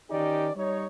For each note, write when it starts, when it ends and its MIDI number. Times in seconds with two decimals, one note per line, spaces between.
0.10 0.49 51
0.10 0.49 61
0.10 0.49 63
0.10 0.49 67
0.10 0.49 74
0.56 0.86 55
0.56 0.86 63
0.56 0.86 73